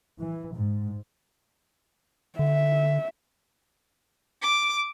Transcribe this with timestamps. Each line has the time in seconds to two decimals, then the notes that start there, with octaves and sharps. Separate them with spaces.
0.20 E3
0.55 G#2
2.39 D3 E5
4.42 D6